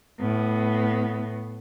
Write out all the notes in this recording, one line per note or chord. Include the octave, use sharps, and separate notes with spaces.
A2 B3